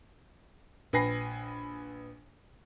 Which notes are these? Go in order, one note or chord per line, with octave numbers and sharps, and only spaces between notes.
A#1 B4 G#5 A#6 C7